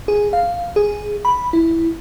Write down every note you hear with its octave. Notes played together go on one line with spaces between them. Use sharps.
G#4
F5
G#4
B5
E4